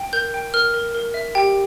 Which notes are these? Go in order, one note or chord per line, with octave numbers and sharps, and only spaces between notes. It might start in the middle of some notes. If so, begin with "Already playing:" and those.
Already playing: G5
A#4 G6
G5
A#4 F6
A#4
A#4
E5
G4 G5